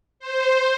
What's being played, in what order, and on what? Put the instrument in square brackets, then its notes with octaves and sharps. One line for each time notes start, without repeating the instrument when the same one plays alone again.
[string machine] C5